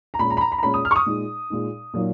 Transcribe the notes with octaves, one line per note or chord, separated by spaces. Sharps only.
A#5
A#2 G#3 C#4 B5
A#5
B5
A#5
B5
A#5
A#2 G#3 C#4 B5
D#6
F6
C#6
D#6
A#2 G#3 D#4
A#2 G#3 D#4
A#2 F#3 A#3 D#4